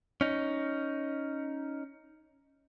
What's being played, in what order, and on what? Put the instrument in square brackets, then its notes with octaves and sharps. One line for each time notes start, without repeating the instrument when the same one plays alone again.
[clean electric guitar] C#4 D#4